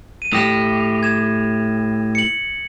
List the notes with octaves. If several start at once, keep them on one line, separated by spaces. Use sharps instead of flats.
D#7
A2 G4 D#6 A#6 E7
G#6 E7
C#7 F#7